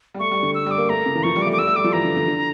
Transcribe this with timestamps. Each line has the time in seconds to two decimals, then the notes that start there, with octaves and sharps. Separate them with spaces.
0.14 G3
0.19 A3 C#6
0.31 G3
0.43 D3
0.55 E6
0.66 G3 D6
0.78 A#3
0.89 A3 A#5
0.98 A#3
1.06 C#3
1.15 E3
1.23 F3 C#6
1.36 G3
1.42 D6
1.47 A3
1.52 D6
1.58 G3 E6
1.67 A3
1.76 G3 D6
1.84 F3
1.93 E3 A#5
2.05 D3
2.17 D3
2.28 D3